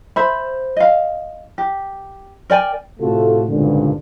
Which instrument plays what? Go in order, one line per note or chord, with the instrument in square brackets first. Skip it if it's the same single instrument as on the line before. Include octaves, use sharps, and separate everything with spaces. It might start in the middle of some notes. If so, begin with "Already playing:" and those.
[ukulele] C5 E5 B5
D#5 F5
G4
A#4 D5 G5 G#5
[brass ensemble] A2 C3 A3 F4 F#4 A4
G#1 C#2 G2 A#2 D3